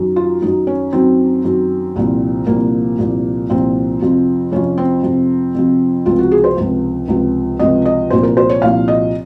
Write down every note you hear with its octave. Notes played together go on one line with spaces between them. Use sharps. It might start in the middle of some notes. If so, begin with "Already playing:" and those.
Already playing: F#2 D#3 F#3
F4
F#2 D#3 F#3 D#4
C#4
F#2 D#3 F#3 C4
F#2 D#3 F#3
C2 A#2 F3
C2 A#2 F3 A#3
C2 A#2 F3
C2 A#2 F3 C4
F2 C3 F3
F2 C3 F3 C#4
C4
F2 C3 F3
F2 C3 F3
C#2 C3 F3 F4
F#4
G#4
C5
C#2 C3 F3
C#2 C3 F3
C#2 C3 F3 D#5
D#5
C2 A#2 F3 C5
A#4
C5
C#5
C2 A#2 F3 F5
D#5